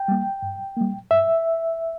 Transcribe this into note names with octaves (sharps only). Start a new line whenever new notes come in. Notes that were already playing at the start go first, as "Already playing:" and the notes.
Already playing: G5
G3 A#3
G2
G3 A#3
G2 E5